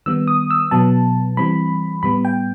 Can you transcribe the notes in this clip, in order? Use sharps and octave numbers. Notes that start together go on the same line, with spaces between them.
D#3 G3 B3 E6
D#6
E6
B2 F#3 B3 A5
E3 G3 C4 B5
A2 G3 B3 B5
G5